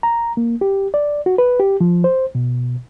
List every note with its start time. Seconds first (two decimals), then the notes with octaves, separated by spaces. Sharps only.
0.03 A#5
0.37 A#3
0.61 G4
0.94 D5
1.26 F#4
1.38 B4
1.60 G4
1.81 F3
2.04 C5
2.35 B2